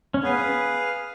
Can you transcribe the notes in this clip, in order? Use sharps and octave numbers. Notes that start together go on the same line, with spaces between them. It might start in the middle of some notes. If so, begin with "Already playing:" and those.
C#4
B3 G#4 B4 F5